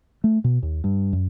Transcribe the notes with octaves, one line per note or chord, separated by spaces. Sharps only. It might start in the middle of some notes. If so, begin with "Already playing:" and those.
A3
B2
D#2
G2
F#2